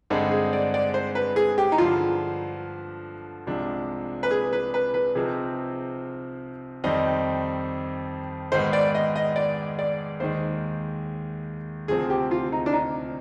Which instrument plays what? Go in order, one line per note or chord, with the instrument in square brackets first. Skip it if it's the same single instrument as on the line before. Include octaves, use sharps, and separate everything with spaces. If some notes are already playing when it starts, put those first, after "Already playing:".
[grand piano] G2 D3 G#3 C4 D#4 [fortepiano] G#4
[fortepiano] G#4
D5
D5
C5
B4
G#4
G4
D#4
[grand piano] G2 D3 F3 [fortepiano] F4
[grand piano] C2 C3 F3 G#3 D4
[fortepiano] B4
G#4
B4
B4
B4
[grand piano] C3 F3 C4 D#4 [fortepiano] G#4
[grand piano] F2 D#3 G3 C4 D#4 [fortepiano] D#5
[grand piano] G#2 D#3 G#3 B3 [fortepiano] C5
[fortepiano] D5
D#5
D#5
D5
D5
[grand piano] D#2 D#3 G#3 [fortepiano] C5
[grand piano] D2 C3 F3 C4 [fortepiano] G#4
[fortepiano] G4
F4
D#4
D4
D#4